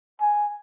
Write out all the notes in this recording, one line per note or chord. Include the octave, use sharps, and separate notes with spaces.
G#5